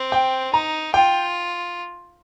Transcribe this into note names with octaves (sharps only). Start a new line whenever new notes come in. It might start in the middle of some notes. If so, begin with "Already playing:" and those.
Already playing: C4
G5
D#4 A#5
F4 G5